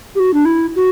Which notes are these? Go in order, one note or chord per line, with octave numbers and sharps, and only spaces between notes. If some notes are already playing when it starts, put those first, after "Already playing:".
G4
F#4
D4
E4
F#4